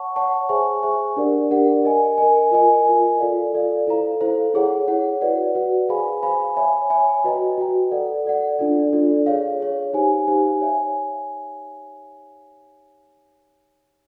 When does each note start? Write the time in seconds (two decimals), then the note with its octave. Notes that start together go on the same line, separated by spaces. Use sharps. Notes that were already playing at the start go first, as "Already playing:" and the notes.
Already playing: C#5 F#5 A5 C#6
0.16 C#5 F#5 A5 C#6
0.49 G#4 C5 E5 G#5 C#6
0.83 G#4 C5 E5 G#5 C#6
1.17 D4 G4 A#4 D5 F#5
1.51 D4 G4 A#4 D5 F#5
1.84 A#4 D#5 G#5
2.18 A#4 D#5 G#5
2.51 F4 A#4 D#5 G#5
2.86 F4 A#4 D#5 G#5
3.19 F4 A4 D5 F5
3.53 F4 A4 D5 F5
3.87 E4 A4 C5 F5 A#5
4.21 E4 A4 C5 F5 A#5
4.54 E4 G#4 C#5 F#5
4.87 E4 G#4 C#5 F#5
5.21 F#4 B4 D5 F#5
5.55 F#4 B4 D5 F#5
5.89 G#4 C5 F5 G#5 B5
6.22 G#4 C5 F5 G#5 B5
6.56 C#5 E5 G#5 B5
6.90 C#5 E5 G#5 B5
7.24 F#4 B4 D#5 G5 A#5
7.58 F#4 B4 D#5 G5 A#5
7.91 A4 D5 F#5
8.25 A4 D5 F#5
8.59 D4 F4 A4 D5
8.93 D4 F4 A4 D5
9.26 G#4 C#5 F5
9.60 G#4 C#5 F5
9.93 D#4 G4 C5 F5 G#5
10.27 D#4 G4 C5 F5 G#5
10.61 C#5 E5 G#5